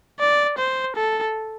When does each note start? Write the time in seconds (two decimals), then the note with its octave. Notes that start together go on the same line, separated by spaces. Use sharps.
0.20 D5
0.58 C5
0.96 A4